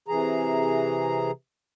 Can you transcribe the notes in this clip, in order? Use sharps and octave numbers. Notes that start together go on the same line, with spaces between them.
C3 E3 G#4 A#5